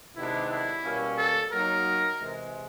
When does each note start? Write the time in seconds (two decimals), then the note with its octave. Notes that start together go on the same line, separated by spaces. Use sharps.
0.16 C3 D#3 G#3 B3 D4 E4
0.50 E4
0.84 B2 G3 A#3 C#4
1.17 A4
1.51 F#3 A#3 D#4 F#4 A#4
2.20 C3 E3 G#3